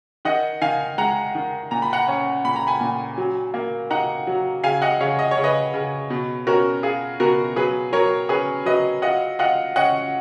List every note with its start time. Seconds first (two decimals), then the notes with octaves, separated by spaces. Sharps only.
0.25 D#3 D#5 F#5
0.61 D#3 F5 G#5
0.98 G#3 F#5 A#5
1.35 D#3
1.71 A#2 A#5
1.82 B5
1.93 F#5 A#5
2.08 C#4
2.45 A#2 B5
2.56 A#5
2.67 G#5 B5
2.81 A#2
3.18 F#3
3.54 A#3
3.90 D#4 F#5 A#5
4.27 F#3
4.64 C#3 F5 G#5
4.82 D#5 F#5
5.00 C#3 C#5 F5
5.19 D#5
5.31 C#5
5.37 C#3
5.44 B4 D#5
5.74 C#3
6.10 B2
6.47 C#4 F#4 A#4
6.83 F4 G#4
7.20 B2 F#4 A#4
7.56 F#3 G#4 B4
7.93 F#3 A#4 C#5
8.29 C#4 G#4 B4
8.66 F#3 B4 D#5
9.02 F4 D#5 F#5
9.39 F4 D#5 F#5
9.76 C#4 D#5 F#5